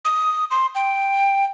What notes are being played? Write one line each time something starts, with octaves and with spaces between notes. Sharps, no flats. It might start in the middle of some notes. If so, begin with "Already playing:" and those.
D#6
C6
G5